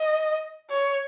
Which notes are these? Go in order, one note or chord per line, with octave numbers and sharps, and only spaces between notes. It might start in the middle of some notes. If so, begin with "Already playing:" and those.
Already playing: D#5
C#5